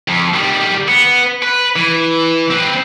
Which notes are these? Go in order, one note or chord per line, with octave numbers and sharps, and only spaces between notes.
F2
D#3 G3
B3
B4
E3
C4 B4